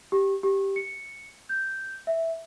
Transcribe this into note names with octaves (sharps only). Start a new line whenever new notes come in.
G4
G4
C#7
G6
E5